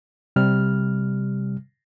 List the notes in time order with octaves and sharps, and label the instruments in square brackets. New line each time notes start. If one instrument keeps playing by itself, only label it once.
[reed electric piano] C3 G3 F6